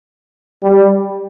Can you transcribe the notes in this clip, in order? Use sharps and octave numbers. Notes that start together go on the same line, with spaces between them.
G3